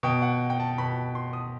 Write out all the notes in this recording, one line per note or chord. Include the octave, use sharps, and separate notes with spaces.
B2 G5
F#5
G5
A5
B2 B5
C6
D#6